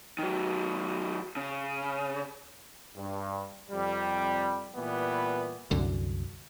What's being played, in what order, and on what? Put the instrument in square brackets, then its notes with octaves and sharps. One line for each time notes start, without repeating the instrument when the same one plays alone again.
[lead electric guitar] D#3 F#3
C#3
[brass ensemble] G2
F2 C3 G3
A#2 E3 G3 B3
[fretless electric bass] C2 F#2 D3